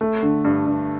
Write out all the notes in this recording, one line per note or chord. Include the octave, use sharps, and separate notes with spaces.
A3
D3
G2
G2